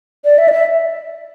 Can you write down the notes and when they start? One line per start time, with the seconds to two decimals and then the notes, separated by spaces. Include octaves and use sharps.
0.25 D5
0.38 E5
0.48 D5
0.52 E5